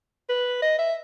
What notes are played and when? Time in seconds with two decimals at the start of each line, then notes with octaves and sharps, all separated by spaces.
0.29 B4
0.62 D#5
0.79 E5